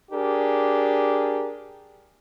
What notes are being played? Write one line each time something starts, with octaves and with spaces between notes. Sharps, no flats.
D4 G4 G#4 A#4